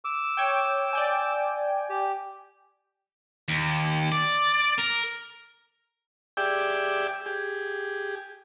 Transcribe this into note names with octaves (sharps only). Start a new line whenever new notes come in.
D6 E6
C#5 G5
D5 G5 G#5
G4
D#2
D5
A#4
G4 G#4 D5 E5 G5
G4 G#4